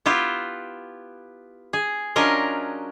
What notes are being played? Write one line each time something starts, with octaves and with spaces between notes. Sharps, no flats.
B3 E4 F4 G4
G#4
F#3 C#4 D4 F4 A#4 D#5